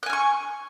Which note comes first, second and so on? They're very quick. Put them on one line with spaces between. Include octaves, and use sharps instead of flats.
F#6 G#5 F6 C#6